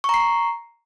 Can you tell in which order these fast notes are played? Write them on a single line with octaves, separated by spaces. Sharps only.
C#6 A#5 C7